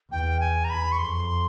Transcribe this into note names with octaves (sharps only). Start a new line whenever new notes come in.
E2 G5
G#5
A#5
B5
C#6
F2 C6